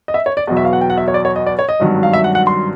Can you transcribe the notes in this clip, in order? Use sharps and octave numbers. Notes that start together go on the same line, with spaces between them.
D#5
E5
C#5
D5
E2 B2 F#3 D#5
E5
F5
F#5
G5
F#5
E5
C#5
D5
C#5
D#5
D5
C#5
D#5
G#1 G2 D#3 F#3
F5
E5
F#5
F#5
C6